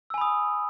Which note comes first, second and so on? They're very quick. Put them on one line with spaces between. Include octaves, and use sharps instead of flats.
E6 G#5 B5 D#6